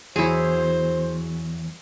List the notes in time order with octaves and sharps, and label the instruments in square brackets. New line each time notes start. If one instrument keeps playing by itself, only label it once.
[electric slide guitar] E2 F#3 [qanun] E4 G#4 [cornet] C5